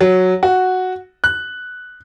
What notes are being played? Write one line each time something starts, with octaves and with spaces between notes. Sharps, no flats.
F#3
F#4
F#6